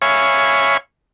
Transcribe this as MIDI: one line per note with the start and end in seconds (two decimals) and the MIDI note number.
0.02 0.77 73
0.02 0.77 76
0.02 0.77 77
0.02 0.77 80
0.02 0.77 83
0.02 0.77 85